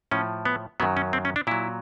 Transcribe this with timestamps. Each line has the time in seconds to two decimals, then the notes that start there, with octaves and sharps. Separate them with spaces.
0.11 A2 F3 C#4
0.45 B3
0.80 F#2 D#3 F#3 B3
0.97 C#4
1.13 C4
1.25 C#4
1.36 D4
1.47 A#2 F#3 E4